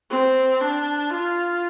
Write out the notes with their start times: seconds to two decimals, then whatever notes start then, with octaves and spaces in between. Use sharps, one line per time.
0.10 C4
0.61 D4
1.10 F4